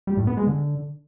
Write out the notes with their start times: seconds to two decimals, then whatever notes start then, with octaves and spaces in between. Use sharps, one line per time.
0.07 G3
0.17 A2
0.27 B3
0.37 G#3
0.47 D3